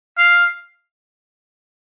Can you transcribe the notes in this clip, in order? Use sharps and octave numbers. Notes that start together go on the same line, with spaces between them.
F5